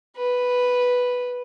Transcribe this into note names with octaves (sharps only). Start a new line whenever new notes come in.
B4